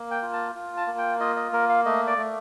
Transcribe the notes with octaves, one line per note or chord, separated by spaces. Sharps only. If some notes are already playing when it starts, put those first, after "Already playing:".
Already playing: A#3
G5
F4
A5
F4
A5
A#3
G5
F4 D#5
D#5
A#3 A#4
F5
A3 D#5
D5
A3